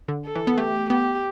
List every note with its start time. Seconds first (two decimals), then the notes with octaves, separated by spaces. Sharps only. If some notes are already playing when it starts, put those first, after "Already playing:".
0.08 D3
0.25 A4
0.36 E3
0.47 B3
0.58 A3 G4
0.90 B3 G4